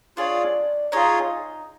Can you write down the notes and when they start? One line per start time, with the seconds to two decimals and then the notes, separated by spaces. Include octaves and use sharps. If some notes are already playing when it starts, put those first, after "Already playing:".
0.17 D4 F4 G#4 C#5 D5
0.92 D#4 F4 G#4 C#5 D#5